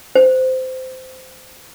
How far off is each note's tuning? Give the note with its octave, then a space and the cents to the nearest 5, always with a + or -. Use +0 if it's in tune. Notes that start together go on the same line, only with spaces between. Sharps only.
C5 -20